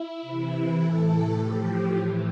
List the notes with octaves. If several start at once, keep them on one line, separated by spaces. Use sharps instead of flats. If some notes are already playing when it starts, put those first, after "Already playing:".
Already playing: E4
C3 E3
A2 E3 A4
A2 F3 G4
A2 E3